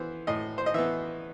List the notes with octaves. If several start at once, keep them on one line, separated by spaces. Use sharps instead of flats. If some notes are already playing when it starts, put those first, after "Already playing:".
Already playing: E3 B3 C5
A2 D#5
C5
D#5
E3 B3 E5